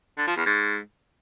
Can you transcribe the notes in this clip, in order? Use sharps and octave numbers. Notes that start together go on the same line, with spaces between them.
D3
F3
E2
G#2